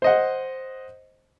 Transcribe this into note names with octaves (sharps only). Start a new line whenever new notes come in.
C5 D#5 F#5